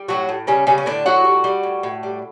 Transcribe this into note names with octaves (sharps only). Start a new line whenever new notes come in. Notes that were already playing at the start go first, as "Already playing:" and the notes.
Already playing: G3
A2 F#3 F#4
A2
C#3 G3 C#4
C#3 G3 C#4
C#4
A2 D3 D4
A2 F#3 F#4
G3
G3
A2
A2
G3